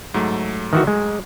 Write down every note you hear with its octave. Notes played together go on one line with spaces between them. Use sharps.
G#2 F#3 A3
D#3 E3 F#4
G#3